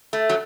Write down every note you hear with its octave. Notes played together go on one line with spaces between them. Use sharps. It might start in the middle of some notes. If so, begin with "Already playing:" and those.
A3
F#3